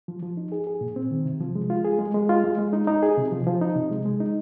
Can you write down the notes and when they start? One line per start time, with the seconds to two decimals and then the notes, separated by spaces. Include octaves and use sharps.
0.08 F3
0.23 F3
0.37 D#4
0.52 G#4
0.67 G#4
0.81 A#2
0.96 C4
1.11 D#3
1.26 C3
1.40 F3
1.55 G#3
1.70 F4
1.85 G#4
1.99 G#3
2.14 G#3
2.29 F4
2.44 G#3
2.58 G#3
2.73 D#4
2.87 D#4
3.02 G#4
3.17 C3
3.32 F3
3.47 F3
3.61 D#4
3.76 C3
3.91 G#3
4.06 G#3
4.20 D#4